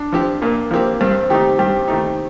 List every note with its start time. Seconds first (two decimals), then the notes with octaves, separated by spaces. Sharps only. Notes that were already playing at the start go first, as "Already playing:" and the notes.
Already playing: D4
0.12 F3 C4 G4
0.42 A#2 A#3
0.71 F3 A#3 C4 G4
1.01 G2 C4
1.30 D#3 A3 D#4 G4
1.59 G2 G4
1.88 D#3 A3 D#4